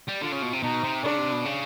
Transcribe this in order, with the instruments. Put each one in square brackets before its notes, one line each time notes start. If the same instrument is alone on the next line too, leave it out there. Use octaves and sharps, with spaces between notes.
[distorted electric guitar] G3
[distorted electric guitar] D3 [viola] F4
[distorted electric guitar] C#3
B2
C3
[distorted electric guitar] B2 [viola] D#4
[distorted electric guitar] C3
[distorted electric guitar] C#3 [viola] D4
[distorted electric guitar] C3
B2
C#3